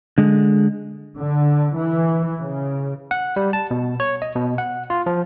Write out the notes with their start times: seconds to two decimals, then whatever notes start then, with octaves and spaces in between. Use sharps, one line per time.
0.18 D3 G#3
1.18 D3
1.76 E3
2.41 C#3
3.11 F#5
3.36 G3
3.53 A5
3.71 B2
4.00 C#5
4.22 D#5
4.35 B2
4.58 F#5
4.90 F4
5.06 F3